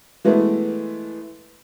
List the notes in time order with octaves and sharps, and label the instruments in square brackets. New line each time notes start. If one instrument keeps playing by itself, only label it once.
[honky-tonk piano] E3 G#3 A3 B3